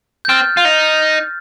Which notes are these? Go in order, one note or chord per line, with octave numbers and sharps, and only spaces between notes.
G6
C4 F6 A6
F4
D#4